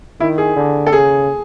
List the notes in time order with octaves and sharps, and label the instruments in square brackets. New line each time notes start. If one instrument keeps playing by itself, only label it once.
[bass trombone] D#3 [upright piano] E4
[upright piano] G#4
[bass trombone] D3
[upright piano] A4
[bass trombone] C#3 [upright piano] G#4